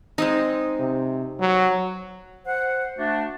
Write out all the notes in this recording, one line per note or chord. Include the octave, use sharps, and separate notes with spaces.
G#3 C4 D#4
C3
F#3
C5 F#5
A3 D4 F#4